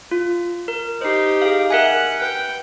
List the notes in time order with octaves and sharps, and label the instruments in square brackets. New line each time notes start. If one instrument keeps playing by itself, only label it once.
[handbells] F4
A#4
[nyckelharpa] D#4 G4 [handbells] C5 C7
[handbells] G#4 F5
[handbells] A#4 E5 G#5 [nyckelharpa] F#5
[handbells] B4 [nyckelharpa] G5